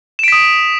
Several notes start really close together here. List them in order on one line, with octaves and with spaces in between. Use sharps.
E7 D7 B6 D#6